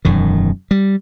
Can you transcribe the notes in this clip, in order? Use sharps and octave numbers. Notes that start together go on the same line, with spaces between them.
E1 F#2 D#3
G3